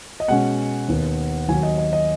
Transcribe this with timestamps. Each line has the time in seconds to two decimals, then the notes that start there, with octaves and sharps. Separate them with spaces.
0.20 D#5
0.28 B2 G#3 C#4 F#5
0.88 D#2 D#3 B3
1.48 D#2 D#3 F#3 G#5
1.63 D#5
1.78 D#5
1.93 D#5